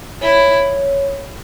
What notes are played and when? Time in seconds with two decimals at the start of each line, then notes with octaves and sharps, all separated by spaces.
0.21 E4 C#5